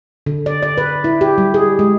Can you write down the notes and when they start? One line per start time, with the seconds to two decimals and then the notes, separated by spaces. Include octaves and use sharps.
0.26 D3
0.46 D5
0.63 D5
0.78 B4
1.04 E4
1.21 G4
1.38 G3
1.54 G#4
1.79 G#3